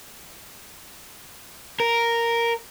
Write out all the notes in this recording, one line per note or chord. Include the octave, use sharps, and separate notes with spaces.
A#4